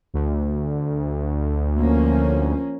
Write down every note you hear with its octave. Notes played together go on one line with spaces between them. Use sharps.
D2
F3 A#3 C#4